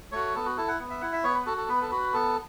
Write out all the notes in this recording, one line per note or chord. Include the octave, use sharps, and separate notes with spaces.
A3 F#4 C#5
B3 A4
F#4
E4 A4
F#5
B3
E5
E4 F#5
E5
B3 C#5
B4
F#4 A4
A4
B3 B4
A4
F#4 B4
B3 A4